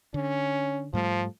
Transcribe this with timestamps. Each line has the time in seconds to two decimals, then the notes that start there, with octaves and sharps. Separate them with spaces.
0.14 D3 C#4
0.93 G#2 F3 G3 A3